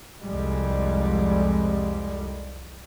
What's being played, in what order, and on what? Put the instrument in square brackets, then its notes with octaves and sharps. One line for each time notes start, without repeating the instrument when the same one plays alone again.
[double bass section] C2 F2 G3 G#3